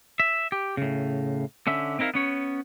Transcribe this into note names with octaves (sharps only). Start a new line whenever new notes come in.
E5
G4
A2 C#3
D3 C#4 E5
C4 D#4 E4 A#4 F5
B3 C#4 C#5